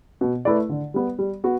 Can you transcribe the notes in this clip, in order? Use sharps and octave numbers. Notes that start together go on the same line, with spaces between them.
B2
A3 E4 B4 D5
D3
G3 B3
G3
B3 F#4